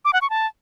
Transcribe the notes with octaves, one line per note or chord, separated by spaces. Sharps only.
D6
F#5
C#6
A5